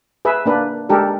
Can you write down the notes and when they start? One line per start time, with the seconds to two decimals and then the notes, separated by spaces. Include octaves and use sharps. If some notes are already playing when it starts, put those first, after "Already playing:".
0.25 G#4 B4 E5
0.46 A#3 D4 B4
0.89 G#3 D4 G4 A4 A#4